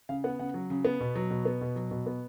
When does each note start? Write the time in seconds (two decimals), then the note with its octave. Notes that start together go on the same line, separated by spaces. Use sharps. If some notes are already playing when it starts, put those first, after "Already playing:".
0.09 C#3 F5
0.24 B3 F#5
0.39 C#3 F#5
0.54 F#3
0.70 C#3
0.85 B3
1.00 B2
1.15 F#3
1.30 B2
1.45 B3
1.61 B2
1.76 F#3
1.91 B2
2.06 B3